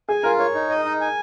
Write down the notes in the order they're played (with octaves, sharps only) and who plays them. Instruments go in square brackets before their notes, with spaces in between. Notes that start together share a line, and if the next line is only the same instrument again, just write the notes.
[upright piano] G#4 [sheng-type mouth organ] G#5
[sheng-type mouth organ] F4 [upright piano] A#4
[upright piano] A#4 [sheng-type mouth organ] C#5
[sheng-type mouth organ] D#4
D#5
D#4
G#5